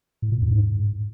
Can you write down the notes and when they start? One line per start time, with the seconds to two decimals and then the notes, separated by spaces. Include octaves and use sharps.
0.22 A2
0.32 A#2
0.41 E2
0.51 G#2